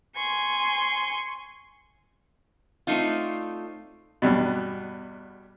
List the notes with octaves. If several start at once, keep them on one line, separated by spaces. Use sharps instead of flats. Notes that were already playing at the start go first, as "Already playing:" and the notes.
G#5 C6 C#6
A3 C4 D4 D#4 F4
E2 G2 B2